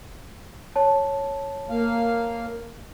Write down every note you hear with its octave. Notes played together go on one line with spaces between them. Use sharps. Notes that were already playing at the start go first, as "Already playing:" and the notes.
C#5 A5
A#3 F5